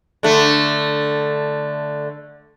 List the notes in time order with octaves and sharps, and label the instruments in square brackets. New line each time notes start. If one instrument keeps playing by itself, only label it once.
[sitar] D3 A3